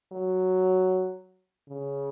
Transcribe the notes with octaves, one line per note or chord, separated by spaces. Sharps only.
F#3
C#3